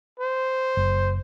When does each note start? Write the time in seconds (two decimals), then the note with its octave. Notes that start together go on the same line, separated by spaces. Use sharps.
0.20 C5
0.77 F#1